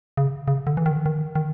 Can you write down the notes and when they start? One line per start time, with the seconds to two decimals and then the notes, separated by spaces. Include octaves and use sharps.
0.17 C#3
0.48 C#3
0.67 D3
0.77 E3
0.86 D#3
1.06 D#3
1.35 D#3